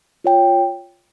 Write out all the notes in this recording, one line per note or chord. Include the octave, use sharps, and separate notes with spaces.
F4 C#5 G5